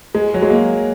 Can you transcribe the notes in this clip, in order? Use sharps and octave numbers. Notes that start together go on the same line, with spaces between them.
G#3
F#3
G#3
A#3